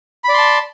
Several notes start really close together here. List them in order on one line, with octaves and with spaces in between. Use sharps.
B5 D5 C6 A5